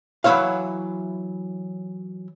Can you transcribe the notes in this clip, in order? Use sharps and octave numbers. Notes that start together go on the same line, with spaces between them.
E3 F#3 A#3 E4 C#5 F5